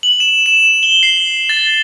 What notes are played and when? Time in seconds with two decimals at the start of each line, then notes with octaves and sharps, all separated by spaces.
0.03 F#7
0.20 E7
0.46 E7
0.83 G7
1.03 C7
1.49 A6